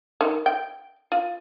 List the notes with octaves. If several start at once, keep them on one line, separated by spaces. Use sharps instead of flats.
D#3
G5
F4